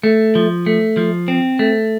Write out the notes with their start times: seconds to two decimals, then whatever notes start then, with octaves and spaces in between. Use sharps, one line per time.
0.03 A3
0.35 F3
0.66 A3
0.97 F3
1.28 C4
1.59 A3